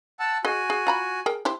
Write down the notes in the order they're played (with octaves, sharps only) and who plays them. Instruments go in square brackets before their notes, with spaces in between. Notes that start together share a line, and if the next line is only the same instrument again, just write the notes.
[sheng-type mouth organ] F#5 A5 E6
[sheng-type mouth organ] F#4 G#5 [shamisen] G#4 D#5
[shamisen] G#4
F4 A#5 B5
G#4 A#4 G5
E4 G4 C5